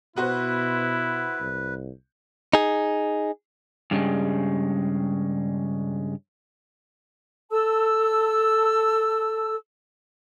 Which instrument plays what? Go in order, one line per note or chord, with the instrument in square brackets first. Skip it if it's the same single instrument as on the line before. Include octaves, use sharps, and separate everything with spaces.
[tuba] B2 [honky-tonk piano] B3 F#4 C5 [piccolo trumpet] E4 [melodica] B4
[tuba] C2
[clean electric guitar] D#4 G#4
[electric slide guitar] G2 C#3 G3 G#3
[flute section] A4 A5 E6